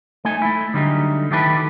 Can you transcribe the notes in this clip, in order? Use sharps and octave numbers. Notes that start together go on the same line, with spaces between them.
A3 D#4 G#5
A3 E4
D3 F#3 G3 A3 D#4
D#3 F#3 E4 G4 A4 B4